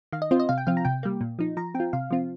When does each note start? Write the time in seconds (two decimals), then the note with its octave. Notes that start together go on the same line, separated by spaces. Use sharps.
0.12 D#3 F5
0.22 D#5
0.31 C4 F4 C5
0.40 D#5
0.49 C3 F5
0.58 G5
0.67 F3 C4 F4 F5
0.77 A#5
0.85 C3 G5
1.03 G3 A#3
1.21 A#2
1.39 F3 D#4
1.57 F3 A#5
1.75 C4 G5
1.80 F4
1.93 C3 F5
2.11 F3 C4 F4